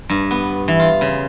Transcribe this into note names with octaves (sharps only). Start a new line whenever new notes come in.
G2
B3
E3
F4
C#3